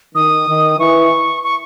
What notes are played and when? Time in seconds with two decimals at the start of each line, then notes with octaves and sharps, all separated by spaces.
0.14 D#3 D#6
0.48 D#3
0.79 E3 C#6
1.44 C#6